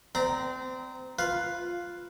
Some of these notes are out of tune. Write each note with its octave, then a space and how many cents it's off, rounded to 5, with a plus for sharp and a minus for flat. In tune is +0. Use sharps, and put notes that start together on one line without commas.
C4 -25 D5 +5 A#5 +0
F4 +0 B4 +0